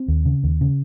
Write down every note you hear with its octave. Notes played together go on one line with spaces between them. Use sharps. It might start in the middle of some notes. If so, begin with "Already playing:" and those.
Already playing: C4
D#2
C#3
D#2
C#3